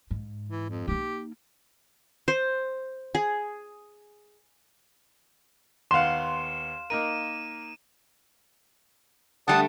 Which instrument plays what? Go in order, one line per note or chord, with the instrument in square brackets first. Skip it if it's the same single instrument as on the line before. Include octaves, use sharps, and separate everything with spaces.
[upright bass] G#2
[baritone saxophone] E3
F2
[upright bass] A#3 D#4 [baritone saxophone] G4
[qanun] C5
G#4
[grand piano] D#2 B3 F#5 [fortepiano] F5 C6 [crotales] E7
[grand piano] A#3 D#4 A#4 [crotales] D#7
[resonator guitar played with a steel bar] D3 G3 A3 [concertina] F#5 A5 D#6